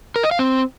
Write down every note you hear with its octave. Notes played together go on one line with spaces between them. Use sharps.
A#4
D#5
F5
C4